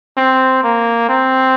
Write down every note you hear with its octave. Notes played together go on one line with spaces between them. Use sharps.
C4
A#3
C4